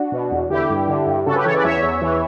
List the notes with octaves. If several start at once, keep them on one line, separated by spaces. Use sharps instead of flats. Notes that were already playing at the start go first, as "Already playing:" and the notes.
Already playing: D4 F#4
B2
E2
D3 E4 G4
G2
D3
G2
C#3 F#4 A4
G4 B4
E3 A4 C#5
B4 D5
E2 C#5 E5
E2
E3